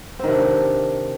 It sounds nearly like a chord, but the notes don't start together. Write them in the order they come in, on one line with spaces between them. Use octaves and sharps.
C4 D#3 C3 D4